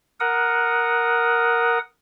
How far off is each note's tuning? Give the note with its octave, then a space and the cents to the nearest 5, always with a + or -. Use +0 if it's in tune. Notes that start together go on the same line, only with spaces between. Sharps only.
A#4 +5 F#5 +0 D#6 +0